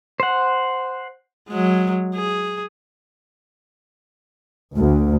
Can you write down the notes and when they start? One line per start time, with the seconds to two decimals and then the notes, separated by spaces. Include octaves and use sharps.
0.20 C5 F#5
1.49 F#3 G#3
2.15 G#4
4.75 D2